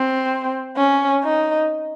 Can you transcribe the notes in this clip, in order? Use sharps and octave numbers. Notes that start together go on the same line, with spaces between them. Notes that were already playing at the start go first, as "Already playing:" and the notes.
Already playing: C4
C#4
D#4